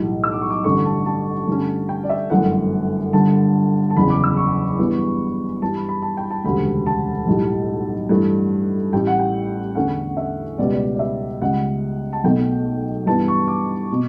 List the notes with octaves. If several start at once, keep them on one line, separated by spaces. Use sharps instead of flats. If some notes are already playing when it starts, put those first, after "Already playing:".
Already playing: B1 A2 E3 G3
E6
D6
C#6
D6
A1 G2 D3 A3 C#4 C#6
A5
A5
G2 D3 A3 C#4
G5
D5
E5
G1 F#2 E3 A3 F#5
G1 G2 D3 A5
A5
F#1 E2 C#3 B5
D6
E6
C#6
G2 E3 B3
G2 E3 G3 A5
B5
B5
A5
G5
A5
E1 D2 C#3 G3 B5
A5
B1 A2 G3
G2 E3 A3
A1 A2 G3 G5
F#5
G5
E2 D3 A3 C#4 F#5
E5
C#2 B2 G3 B3 D5
D5
D5
E5
C#2 C#3 G3 F#5
A5
B1 B2 A3 G5
G2 E3 B3 A5
C#6
D6
B2